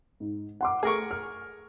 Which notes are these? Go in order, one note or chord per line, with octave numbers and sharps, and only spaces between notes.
G#2
F#5 C6 D6
A3 G#4 A#4 C#6
F6